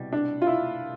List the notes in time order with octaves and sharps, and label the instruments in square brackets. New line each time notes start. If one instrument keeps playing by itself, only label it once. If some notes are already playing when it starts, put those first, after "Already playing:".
Already playing: [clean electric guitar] C2 B2 G3
[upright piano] D4
F4
E4